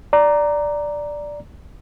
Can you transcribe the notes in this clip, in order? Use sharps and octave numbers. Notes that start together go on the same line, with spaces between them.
D5 A#5